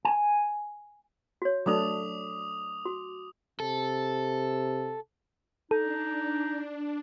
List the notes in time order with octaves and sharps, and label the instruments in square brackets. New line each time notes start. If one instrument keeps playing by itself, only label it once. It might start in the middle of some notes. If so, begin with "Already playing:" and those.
[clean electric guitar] G#5
[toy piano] F#4 C#5
[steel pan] F#3 A3 D4 [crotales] D6 D#6 F7
[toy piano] F#4
[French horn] C3 [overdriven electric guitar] A4
[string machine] D4 [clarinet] D#4 [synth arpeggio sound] A4